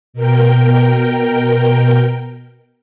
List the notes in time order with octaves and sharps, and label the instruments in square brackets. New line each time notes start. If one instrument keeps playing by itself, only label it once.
[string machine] B2 A#4 G5